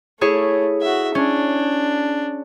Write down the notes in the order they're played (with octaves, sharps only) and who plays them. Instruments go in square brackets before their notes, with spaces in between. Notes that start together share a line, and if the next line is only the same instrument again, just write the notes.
[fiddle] A3 [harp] E4 G#4 C#5
[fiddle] F#4 E5
[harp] C#4 [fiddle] D4